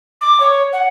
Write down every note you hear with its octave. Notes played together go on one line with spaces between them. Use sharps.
D6
C#5
F#5